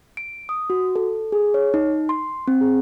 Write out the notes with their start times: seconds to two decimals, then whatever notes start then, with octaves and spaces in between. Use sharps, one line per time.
0.17 D7
0.49 D#6
0.70 F#4
0.96 A4
1.32 G#4
1.54 C#5
1.74 D#4
2.09 C6
2.48 C4
2.61 G#4